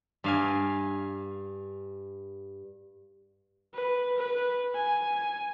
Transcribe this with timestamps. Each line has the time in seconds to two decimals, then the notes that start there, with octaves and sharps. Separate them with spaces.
0.24 G2 F5 G#5
3.74 B4
4.17 B4
4.75 G#5